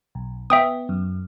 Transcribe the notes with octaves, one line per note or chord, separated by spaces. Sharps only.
B1
B3 E5 G5 D#6
F#2